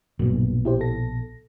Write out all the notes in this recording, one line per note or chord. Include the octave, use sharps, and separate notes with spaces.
A#1 G2 B2 F#3 A#3
E4 G4 C5
A4 A#6